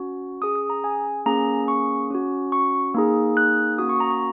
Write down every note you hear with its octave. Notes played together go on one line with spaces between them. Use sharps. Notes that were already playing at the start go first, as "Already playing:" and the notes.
Already playing: C#4 F#4
C#4 G#4 D#6
D#6
A#5
G#5
A#3 C#4 G#4 A#5
C#6
C#4 F#4
C#6
A#3 D#4 G#4
F#6
A#3 C#4 F#4 D#6
C#6
A#5
C#6